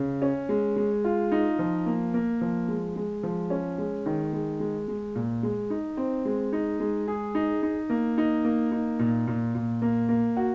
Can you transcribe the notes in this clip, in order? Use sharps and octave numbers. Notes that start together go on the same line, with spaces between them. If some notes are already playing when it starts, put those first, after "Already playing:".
Already playing: C#3
C#4
G#3
G#3
F4
D#4
F3
A#3
A#3
F3
G#3
G#3
F3
C#4
G#3
D#3
G#3
G#3
G#3
A#2
G#3
D#4
C4
G#3
D#4
G#3
G#4
D#4
D#4
A#3
D#4
A#3
D#4
A#2
A#2
A#2
A#3
A#3
F#4